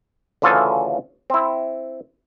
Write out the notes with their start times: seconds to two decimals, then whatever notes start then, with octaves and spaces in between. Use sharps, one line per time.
0.42 D2 C#3 E3 F4 A4 G#5
1.30 C4 E4